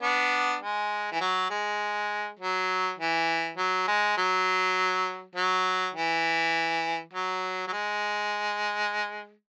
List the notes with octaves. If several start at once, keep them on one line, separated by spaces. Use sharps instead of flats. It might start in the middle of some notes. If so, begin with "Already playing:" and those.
B3 D4
G#3
E3
F#3
G#3
F#3
E3
F#3
G#3
F#3
F#3
E3
F#3
F#3
G#3